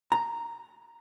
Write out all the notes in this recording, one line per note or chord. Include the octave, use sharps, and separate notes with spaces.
A#5